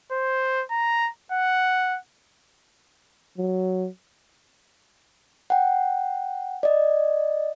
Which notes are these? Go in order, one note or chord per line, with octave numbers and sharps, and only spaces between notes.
C5
A#5
F#5
F#3
F#5 G5
D5 D#5